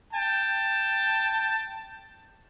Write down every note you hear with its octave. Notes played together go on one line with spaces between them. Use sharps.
G5 A5